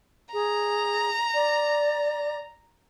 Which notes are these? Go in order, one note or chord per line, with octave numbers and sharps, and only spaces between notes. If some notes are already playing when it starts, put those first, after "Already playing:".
G#4 A#5
D5